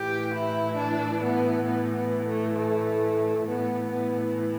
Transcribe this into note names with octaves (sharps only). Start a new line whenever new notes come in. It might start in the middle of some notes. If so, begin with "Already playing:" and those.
Already playing: A2 E3 G4
E4
D4
B3
B3
B3
A3
A3
A2 E3 B3
B3